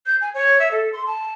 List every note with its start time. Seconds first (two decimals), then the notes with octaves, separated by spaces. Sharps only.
0.07 G6
0.21 G#5
0.34 C#5
0.59 E5
0.71 A4
0.93 C6
1.07 A5